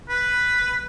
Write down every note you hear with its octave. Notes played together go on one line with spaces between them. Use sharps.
B4